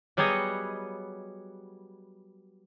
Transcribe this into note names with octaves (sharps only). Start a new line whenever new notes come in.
F#3 G3 B3 G#4 C#5 D#5